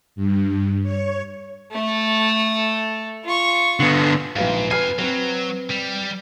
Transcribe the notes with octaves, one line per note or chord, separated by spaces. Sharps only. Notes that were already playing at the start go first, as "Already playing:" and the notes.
G2
C#5
A3 A4
F4 C#6
D3 B3
A#1 G#2 B4 F5
F2 B4 G#5 F6 C7
F#3 C4 B4
G3